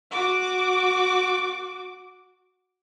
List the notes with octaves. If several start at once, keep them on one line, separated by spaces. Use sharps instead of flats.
F#4 D6